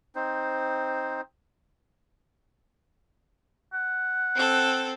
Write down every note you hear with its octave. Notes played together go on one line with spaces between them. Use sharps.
C4 D#4 C5
F#5
C4 A4